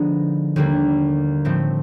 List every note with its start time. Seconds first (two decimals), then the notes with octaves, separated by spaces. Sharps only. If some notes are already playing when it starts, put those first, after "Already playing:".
Already playing: D3 F3 G#3 B3 D#4
0.56 D#2 D3 G3 A#3
1.45 A2 F3 A3 C4